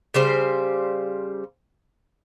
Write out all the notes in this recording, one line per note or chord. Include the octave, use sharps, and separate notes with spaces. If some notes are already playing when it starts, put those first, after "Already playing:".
C#3 G3 C5